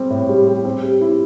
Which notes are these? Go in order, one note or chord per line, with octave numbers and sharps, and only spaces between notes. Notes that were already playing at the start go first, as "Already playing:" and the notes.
Already playing: G3 C4 G4
A2
G3
G4
C4
G4
E4